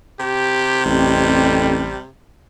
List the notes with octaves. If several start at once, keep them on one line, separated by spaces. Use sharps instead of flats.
C3 G4
A1 F2 G3